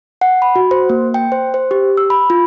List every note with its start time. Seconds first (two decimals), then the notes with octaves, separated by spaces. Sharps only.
0.21 F#5
0.42 B5
0.56 F#4
0.71 C5
0.89 A#3
1.14 G5
1.32 C5
1.54 C5
1.71 G4
1.97 E6
2.10 B5
2.30 F4